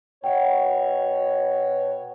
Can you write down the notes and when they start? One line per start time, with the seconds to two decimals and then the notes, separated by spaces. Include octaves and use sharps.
0.24 B2 C#5 F#5 G5